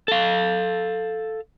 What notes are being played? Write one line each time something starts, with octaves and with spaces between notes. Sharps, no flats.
A4 F5